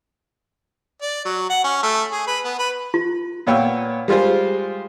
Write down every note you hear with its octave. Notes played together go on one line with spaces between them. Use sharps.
D5
F#3
F#5
C#4
A3
G#4
B4
B3
B4
F4
A#2 B3 C#5 F5 G5 E6
G3 G#3 F4 G#4 C5